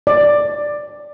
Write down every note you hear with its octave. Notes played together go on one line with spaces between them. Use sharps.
D5